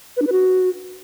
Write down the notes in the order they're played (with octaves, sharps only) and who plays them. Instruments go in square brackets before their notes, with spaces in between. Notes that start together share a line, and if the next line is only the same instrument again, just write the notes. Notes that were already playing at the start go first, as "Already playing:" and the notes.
[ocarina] B4
D4
B4
F#4